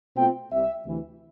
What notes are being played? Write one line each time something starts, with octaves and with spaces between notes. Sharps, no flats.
B2 A3 C4 F4 G5
C2 C3 G3 E5
D2 C3 E3